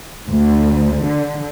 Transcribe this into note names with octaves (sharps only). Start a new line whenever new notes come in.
D2
D3